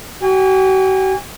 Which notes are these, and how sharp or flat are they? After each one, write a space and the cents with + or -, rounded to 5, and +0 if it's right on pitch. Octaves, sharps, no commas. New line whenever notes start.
F#4 +45 G#5 -35